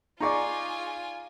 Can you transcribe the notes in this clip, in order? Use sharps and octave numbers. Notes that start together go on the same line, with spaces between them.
D#4 F4 G#4 D5 G#5 A#5 C#6 D6